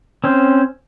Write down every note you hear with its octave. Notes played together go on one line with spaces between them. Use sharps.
C4 C#4 C5